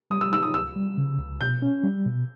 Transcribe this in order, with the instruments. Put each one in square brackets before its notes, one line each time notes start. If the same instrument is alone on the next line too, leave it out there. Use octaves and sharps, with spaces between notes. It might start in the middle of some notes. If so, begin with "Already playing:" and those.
[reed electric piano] G3 [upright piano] D#6
[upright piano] E6
[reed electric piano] D#4 [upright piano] E6
[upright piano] D#6
[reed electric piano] C#2 [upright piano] E6
[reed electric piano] G3
C#3
C#2
[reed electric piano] B2 [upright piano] G6
[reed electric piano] C#4
G3
B2